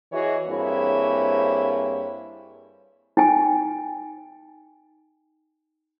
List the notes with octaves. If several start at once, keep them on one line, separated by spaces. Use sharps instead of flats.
E3 E4 F#4 G#4 C#5 D#5
G2 A#3 C4 E4 G#4 C#5
D#4 G5 G#5